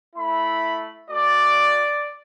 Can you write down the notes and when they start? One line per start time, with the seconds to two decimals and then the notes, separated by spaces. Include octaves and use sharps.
0.15 A3 E4 B5
1.09 A3 F#4 D5